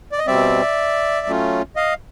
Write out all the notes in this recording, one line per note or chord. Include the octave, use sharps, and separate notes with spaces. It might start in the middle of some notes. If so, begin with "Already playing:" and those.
D5
D#5
B2 G3 C4 D5 E5
F#3 A3 C#4 F4
D#5 F5